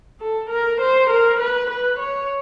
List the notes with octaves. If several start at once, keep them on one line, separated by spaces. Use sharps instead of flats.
A4
A#4
C5
A#4
B4
B4
C#5